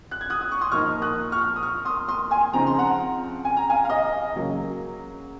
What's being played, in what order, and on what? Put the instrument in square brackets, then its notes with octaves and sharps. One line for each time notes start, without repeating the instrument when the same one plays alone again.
[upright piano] F#6
G#6
D#6 F#6
D#6
C#6
C6 D#6
A#2 F3 A#3 D#4 C#6 F6
D#6 F#6
C#6 F6
D#6
C#6 F6
C6 D#6
C6 D#6
G#5 C6
C#3 F3 C4 D#4 A#5
C6
F#5 A#5
G#5
A#5
F5 G#5
F5
D#5
C#3 F#3 A#3